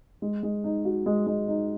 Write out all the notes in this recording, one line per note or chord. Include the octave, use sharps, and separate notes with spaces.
G#3
G#3
D#4
F#4
G#3
G#3
D#4